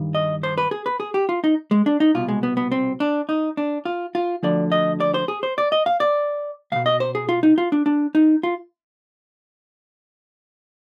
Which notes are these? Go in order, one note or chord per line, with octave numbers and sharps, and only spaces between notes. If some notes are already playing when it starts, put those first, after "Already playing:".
Already playing: G2 D#3
D#5
C5
B4
G#4
B4
G#4
G4
F4
D#4
G#3
D4
D#4
C2 B2 F4
G#3
B3
B3
C4
D4
D#4
D4
F4
F4
D2 D3 F3 D5
D#5
D5
C5
G#4
C5
D5
D#5
F5
D5
C2 B2 F5
D#5
C5
G#4
F4
D#4
F4
D4
D4
D#4
F4